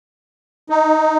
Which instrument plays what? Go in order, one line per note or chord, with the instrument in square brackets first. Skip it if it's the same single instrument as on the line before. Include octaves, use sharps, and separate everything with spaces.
[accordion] D#4